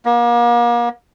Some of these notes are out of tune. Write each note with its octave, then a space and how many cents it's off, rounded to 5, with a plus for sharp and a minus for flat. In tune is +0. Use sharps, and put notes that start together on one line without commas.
A#3 +35